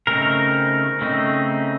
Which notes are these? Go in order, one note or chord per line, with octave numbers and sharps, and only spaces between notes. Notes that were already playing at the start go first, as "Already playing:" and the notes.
C#3 A3 C4 D#4 A#4
C#3 A3 C4 D#4